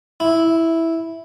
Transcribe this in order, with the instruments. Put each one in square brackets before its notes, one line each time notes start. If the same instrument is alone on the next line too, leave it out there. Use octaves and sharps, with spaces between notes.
[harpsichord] E4